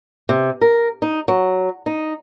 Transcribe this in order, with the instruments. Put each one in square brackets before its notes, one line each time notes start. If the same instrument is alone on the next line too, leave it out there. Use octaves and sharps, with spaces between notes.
[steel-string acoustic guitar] C3
A#4
D#4
F#3
D#4